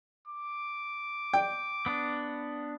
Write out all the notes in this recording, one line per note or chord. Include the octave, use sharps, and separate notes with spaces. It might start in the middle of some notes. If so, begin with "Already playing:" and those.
D6
G5
B3 D4